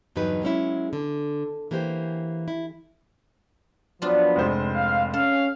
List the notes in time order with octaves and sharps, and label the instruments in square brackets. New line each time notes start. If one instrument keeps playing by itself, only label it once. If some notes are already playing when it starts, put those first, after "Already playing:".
[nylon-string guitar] E2 G2 D3 F#3 D#4 B4
F#3 G#3 C#4 E4
D3
E3 A#3 G4 C5
E4
[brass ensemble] F3 F#3 B3 [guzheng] D4 F4
[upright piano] F1 G#2 C5
[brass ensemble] F5
[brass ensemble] C#4 F5 [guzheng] A4